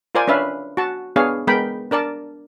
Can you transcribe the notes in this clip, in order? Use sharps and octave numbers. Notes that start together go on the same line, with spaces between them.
F4 A#4 C5 D5 G#5
C#4 D4 B4 E5 F5
F#4 A5
B3 D4 G#4 C#5 F5
G#3 B3 A#4 G5 B5
D4 A#4 D5 A5